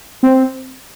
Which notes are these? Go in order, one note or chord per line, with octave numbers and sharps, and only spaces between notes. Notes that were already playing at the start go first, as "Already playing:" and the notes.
C4